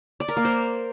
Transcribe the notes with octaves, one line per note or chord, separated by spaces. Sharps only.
D5
A#4
A#3
C5